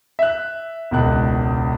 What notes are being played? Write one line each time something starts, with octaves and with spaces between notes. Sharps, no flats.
E5 F#6
E1 C#2 F#6